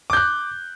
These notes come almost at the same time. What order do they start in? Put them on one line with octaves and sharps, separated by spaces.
D6 G6 F#6